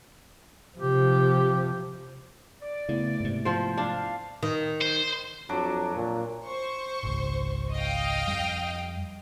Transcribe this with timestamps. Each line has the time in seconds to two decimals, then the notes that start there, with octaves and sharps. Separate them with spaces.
0.78 C3 F3 G4
2.62 D5
2.89 C#3 A3 B3 E4
3.20 G#2 C3
3.45 F3 C5
3.78 D4 F5
4.43 D#3
4.81 C5
5.49 F2 F#3 D4 D6
5.95 A#2
6.45 C5 C#6
7.03 G#1 C#2
7.73 D#5 F5 G5
8.28 F2 G3